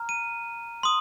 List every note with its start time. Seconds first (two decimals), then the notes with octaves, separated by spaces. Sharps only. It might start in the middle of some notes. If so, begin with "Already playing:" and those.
Already playing: A#5 F6
0.09 D#7
0.83 C6 D#6